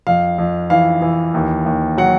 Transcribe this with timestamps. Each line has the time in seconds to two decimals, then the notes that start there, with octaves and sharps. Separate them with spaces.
0.07 F2 F5
0.38 F2
0.70 E3 F5
1.02 E3
1.34 D#2
1.66 D#2
1.98 F#3 F#5